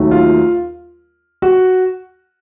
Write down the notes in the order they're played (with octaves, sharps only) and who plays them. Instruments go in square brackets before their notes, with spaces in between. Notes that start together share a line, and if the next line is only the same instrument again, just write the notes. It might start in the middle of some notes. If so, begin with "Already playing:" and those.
Already playing: [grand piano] D#2 D#3 F#3 A3
F4
F#4